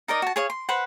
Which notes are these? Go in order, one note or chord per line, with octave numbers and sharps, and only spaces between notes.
D#4 A#4 D5 D#5
F#4 A5
G#4 C#5 F5
C6
B4 C5 F#5